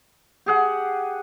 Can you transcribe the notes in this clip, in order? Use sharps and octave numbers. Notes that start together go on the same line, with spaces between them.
G4 G#4 F#5